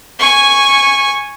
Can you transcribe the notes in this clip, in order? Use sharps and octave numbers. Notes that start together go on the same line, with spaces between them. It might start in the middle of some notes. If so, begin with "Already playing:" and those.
G#5 C#6